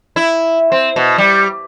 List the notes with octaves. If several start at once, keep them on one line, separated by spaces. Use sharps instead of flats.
E4
C4
B2
G3